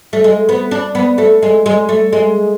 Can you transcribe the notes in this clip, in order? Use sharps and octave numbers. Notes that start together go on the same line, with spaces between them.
A3
G#3
B3
D4
B3
A3
G#3
G#3
A3
G#3